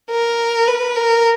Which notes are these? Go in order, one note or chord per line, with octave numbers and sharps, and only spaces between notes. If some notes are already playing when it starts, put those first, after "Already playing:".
A#4
B4
A#4